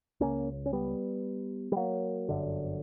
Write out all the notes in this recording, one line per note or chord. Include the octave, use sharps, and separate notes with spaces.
C#2 C#3 A#3 C#4
C#4
G3 B3
G3
F#3 A#3
G1 F#2 D3